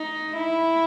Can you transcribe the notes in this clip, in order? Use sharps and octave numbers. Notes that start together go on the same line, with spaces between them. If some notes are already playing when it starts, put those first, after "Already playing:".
Already playing: D#4
E4